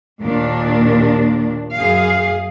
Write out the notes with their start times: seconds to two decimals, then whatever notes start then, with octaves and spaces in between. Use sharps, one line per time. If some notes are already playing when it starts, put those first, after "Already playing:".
0.22 D#2 A#2 D4
1.74 F#2 G#4 F5